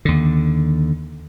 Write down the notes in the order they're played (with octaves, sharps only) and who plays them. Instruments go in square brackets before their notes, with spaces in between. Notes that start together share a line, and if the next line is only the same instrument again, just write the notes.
[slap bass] D#2 D3